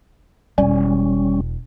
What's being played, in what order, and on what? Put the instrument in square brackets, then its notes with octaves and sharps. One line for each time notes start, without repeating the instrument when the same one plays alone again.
[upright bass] E1 [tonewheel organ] G3 C#4